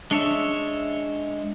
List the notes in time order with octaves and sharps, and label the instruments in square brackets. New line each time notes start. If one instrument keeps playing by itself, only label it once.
[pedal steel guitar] G#3 C#5 E5 [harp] D4